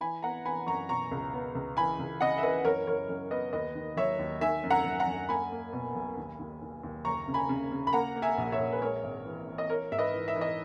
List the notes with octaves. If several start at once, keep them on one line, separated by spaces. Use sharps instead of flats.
E3 G#5 B5
B3 F#5 A#5
E3 G#5 B5
F#2 A#5 C#6
B2 A#5 C#6
C#2
B3
C#2
E3 G#5 B5
C#2
C#3 D#5 F#5
E5
E3 B4 D#5
F#2 A#4 C#5
F#2 A#4 C#5
F#2 A#4
B3 B4 D#5
D#2 B4 D#5
D#3
F#3 C#5 E5
D#2
D#3 E5 G#5
F#2
F#5 A#5
F#2
F#5 A#5
F#2
A#3 G#5 B5
A#3
B2
B1
D#2
D#2
D#2
D#2
F#1 A#5 C#6
C#3
G#5 B5
C#3
C#3
B5
A#3 F#5 A#5
A#3
E5 G#5
A#1
C#5 E5
A#1
B4
G#3 A#4 C#5
G#1
E3
E3
D#5
A#3 A#4 C#5
G#2 E5
B4 D#5
E3
E5
E3
D#5